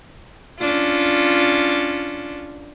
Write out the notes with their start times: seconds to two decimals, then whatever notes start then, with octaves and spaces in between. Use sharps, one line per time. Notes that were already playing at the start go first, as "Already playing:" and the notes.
0.59 C#4 D4 F4